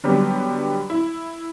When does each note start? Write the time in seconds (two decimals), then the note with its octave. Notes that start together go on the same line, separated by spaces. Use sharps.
0.04 D3 F#3 G3 B3 G4
0.90 E4